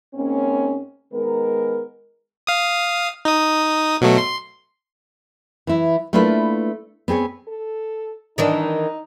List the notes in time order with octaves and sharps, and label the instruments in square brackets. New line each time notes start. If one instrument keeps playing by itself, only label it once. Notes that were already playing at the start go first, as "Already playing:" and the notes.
[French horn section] G#2 A#3 C4 C#4
D#3 G#3 B3 A#4
[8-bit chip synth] F5 D#6
D#4 D#6
B2 F#3 A3
C6
[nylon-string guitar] E3 E4
A3 A#3 D4 E4 F4 B4
B3 C4 G#4 C#5
[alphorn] A4
[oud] D#3 E3 D4 [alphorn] D#4